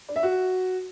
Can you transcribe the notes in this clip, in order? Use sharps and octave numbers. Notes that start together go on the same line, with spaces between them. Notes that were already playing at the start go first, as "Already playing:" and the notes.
D4
E5
F#4